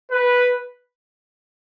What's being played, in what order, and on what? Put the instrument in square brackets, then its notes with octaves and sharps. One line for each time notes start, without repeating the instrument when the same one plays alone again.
[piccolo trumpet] B4